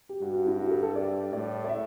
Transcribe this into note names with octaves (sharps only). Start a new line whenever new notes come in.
G4
G2 F#4
F#4
E4
F#4
G4
A4
A4
D5
A2 D5
D5
E5